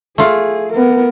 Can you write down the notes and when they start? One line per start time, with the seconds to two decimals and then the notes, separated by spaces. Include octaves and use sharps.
0.18 A3 F4 G#4
0.72 B3 A#4